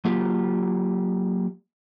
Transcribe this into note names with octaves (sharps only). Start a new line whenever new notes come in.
F#3 A#3 F4 G4